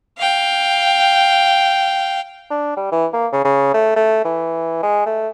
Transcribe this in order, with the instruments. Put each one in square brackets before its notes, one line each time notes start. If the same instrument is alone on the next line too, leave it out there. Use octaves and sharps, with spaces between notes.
[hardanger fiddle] F5 G5
[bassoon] D4
G3
E3
A#3
C#3
C#3
A3
A3
E3
G#3
A3